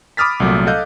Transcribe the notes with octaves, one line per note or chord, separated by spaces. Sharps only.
B5 D6 D#6 F6 A6 B6
C2 A#2 F#3 A3
A4 D#5 F5 F#6 G6